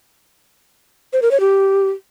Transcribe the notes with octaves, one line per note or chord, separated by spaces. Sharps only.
C5
A#4
C#5
G4